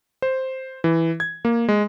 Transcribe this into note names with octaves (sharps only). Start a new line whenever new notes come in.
C5
E3
G#6
A#3
G#3